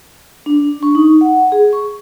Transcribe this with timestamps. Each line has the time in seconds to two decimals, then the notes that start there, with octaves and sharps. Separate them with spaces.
0.46 D4
0.83 C#6
0.95 D#4
1.21 F#5
1.52 G#4
1.73 C#6